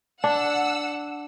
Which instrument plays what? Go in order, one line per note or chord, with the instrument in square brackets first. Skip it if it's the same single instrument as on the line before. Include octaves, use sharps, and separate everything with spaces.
[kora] D4 [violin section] F#5 E6